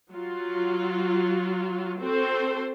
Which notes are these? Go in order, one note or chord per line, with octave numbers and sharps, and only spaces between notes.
F#3 F4
C4 F#4 A4 C5